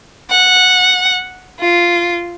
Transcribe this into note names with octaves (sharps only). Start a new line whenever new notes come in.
F#5
F4